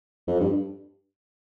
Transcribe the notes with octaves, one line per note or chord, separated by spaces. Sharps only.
F2
G2